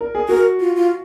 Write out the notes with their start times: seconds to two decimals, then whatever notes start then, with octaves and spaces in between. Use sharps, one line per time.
0.01 A#4
0.15 G#4
0.28 F#4 A#4
0.60 F4
0.76 F4